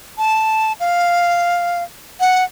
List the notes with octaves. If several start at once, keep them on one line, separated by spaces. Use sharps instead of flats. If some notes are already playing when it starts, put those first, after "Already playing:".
A5
F5
F#5